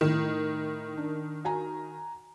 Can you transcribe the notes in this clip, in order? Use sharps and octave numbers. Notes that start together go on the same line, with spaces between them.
A2 D#3
D4
F#4 G#5 A#5